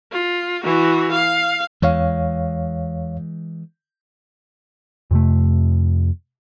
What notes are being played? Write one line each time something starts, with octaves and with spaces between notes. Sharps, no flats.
F4
E3 F#4
F5
E2 E3 G#3 C#5 F5
F2 C3 A3